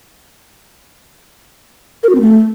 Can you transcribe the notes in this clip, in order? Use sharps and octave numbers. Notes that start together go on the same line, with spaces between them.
A#4
F#4
C4
A3